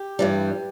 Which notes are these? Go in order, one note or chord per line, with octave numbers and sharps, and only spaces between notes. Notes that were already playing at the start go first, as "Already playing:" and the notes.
Already playing: G4
G2 E3 G3